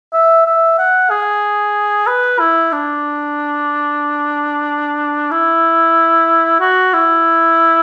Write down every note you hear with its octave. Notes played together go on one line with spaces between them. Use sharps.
E5
E5
F#5
G#4
B4
E4
D4
E4
F#4
E4